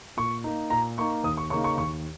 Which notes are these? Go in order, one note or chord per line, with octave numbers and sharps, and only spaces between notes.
A#2 C#6
A#3 D#4
A#2 A#5
A#3 D#4 C#6
D#2 D#6
C#6
C#3 A#3 D#4 C#6
C#6
D#2 C#6